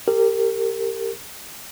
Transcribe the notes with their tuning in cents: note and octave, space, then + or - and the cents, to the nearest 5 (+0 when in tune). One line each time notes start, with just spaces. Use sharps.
G4 +10 A#4 -30